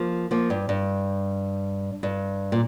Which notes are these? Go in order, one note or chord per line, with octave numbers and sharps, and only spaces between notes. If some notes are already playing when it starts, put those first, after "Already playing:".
Already playing: F3 A#3
F3 A#3
G2
G2
G2
A#2